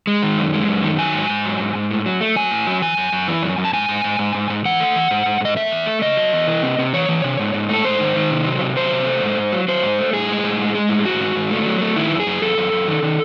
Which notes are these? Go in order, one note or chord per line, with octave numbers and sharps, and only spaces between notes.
G#3
D#3
F#2
G#3
F#2
D#3
F#3 G#5
G#2
G#2
F#3
G#2
G#2
A2
F#3
A3
F#3 G#5
A2
F#3
E3 G#5
F#2
F#2
E3
F#2
F#2
A5
G#2 G#5
G#2
G#2
G#2
G#2
G#2
E3 F#5
A3
E3
G#2
G#2
G#2 D#5
A3 E5
E2
A3
C#3 D#5
F#3
E2
E3
C3
C3
E3 C#5
E3
C3
G#2
G#2
A3 A4
G#2 C5
D#3
D#3
C3
F#3
C3
F#3 C5
C3
A3
G#2
G#2
F#3
F#3 C5
G#2
A3
A2 G#4
G#3
A2
G#3
G#3
A2
G#2 F#4
G#2
G#2
A3
F#3
A3
D#3 E4
F#2
G#4
F#2
F#2 A4
F#2
F#2
D#3
D#3